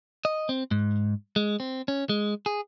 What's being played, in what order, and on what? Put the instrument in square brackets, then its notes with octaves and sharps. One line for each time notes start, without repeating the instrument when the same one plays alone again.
[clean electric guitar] D#5
C4
G#2
G#3
C4
C#4
G#3
G#4